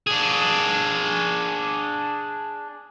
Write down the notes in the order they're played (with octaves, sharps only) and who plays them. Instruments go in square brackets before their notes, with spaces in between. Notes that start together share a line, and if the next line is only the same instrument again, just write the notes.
[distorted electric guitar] D4 G#4